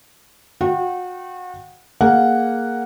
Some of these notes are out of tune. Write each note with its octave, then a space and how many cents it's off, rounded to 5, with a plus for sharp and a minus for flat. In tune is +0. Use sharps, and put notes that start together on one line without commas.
F#4 -35 G5 -35
A#3 +0 G#4 +0 F#5 +0